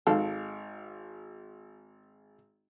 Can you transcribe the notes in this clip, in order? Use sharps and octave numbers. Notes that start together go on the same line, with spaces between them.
G#1 A4 F5